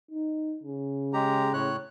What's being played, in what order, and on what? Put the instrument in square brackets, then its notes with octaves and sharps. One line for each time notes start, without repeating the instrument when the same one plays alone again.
[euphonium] D#4
C#3
[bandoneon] G#3 G4 A#5
A2 C#5 F#6